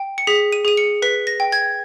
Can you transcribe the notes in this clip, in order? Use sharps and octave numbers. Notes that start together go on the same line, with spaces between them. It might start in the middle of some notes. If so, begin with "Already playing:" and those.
Already playing: G5
C#7
G#4 B6
D#7
G#4 D#7
C#7
B4 B6
A#6
G5
G#6